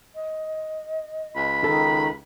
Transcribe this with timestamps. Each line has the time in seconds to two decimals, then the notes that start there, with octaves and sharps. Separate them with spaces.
0.14 D#5
1.36 C#2 B5
1.64 D#3 A4